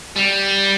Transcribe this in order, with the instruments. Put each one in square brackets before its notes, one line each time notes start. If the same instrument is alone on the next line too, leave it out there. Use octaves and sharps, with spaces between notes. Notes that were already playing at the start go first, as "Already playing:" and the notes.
[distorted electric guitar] G3